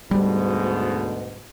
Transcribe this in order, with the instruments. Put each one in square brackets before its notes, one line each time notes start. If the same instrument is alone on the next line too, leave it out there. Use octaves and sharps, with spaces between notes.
[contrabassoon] D2 [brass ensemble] G#2 B2 [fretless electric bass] G3